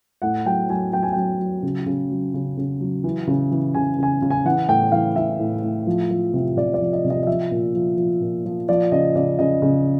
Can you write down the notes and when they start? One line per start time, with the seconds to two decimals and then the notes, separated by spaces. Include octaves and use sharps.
0.22 A2 F#5
0.45 F#3 G5
0.69 F#3 G#5
0.92 F#3 G5
1.03 G#5
1.13 F#3 G5
1.39 F#3
1.63 C#3
1.86 C#3
2.10 F#3
2.34 C#3
2.57 C#3
2.80 F#3
3.04 E3
3.27 C#3
3.51 E3
3.75 C#3 G#5
3.99 C#3 G#5
4.22 C#3
4.30 G#5
4.45 E3 F#5
4.68 A2 G5
4.92 E3 F5
5.16 E3 E5
5.39 A2
5.63 A2
5.87 F3
6.11 F3
6.34 C3
6.57 C3 D5
6.74 D5
6.80 F3
6.93 D#5
7.05 C3
7.10 D#5
7.23 D#5
7.27 F3 E5
7.51 A#2
7.75 F3
7.97 F3
8.21 A#2
8.45 F3
8.69 F3 D5
8.92 C#3 D#5
9.15 C#3 D5
9.39 C#3 D#5
9.62 C#3